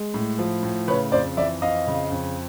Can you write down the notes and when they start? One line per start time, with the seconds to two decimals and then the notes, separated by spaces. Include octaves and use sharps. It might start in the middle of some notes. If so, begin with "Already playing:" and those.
Already playing: G#3
0.14 A2
0.39 F3
0.63 A2
0.88 C#3 B4 C#5
1.12 F2 C5 D5
1.37 E3 D5 E5
1.61 F2 D#5 F5
1.87 C#3
2.12 F2